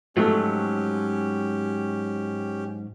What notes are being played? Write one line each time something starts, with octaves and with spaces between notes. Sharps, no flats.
G#2 F3 F#3 A3 C#4 G4